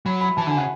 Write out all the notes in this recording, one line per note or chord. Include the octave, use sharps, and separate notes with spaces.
F#3 B5
B5
E3 A5
D3 G#5
C#3 F#5